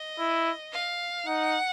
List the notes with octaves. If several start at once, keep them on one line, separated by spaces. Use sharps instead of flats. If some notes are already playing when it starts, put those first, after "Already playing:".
Already playing: D#5
E4
F5
D#4 F#5